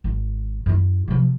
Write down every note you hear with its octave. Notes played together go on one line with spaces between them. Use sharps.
G#1
F#2 E4
C3 F3